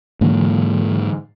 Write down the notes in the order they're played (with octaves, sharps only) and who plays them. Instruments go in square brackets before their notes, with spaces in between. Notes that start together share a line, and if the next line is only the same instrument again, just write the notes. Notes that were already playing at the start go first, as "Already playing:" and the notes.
[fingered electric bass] G#2 A#3 [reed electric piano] D3 E3 F#3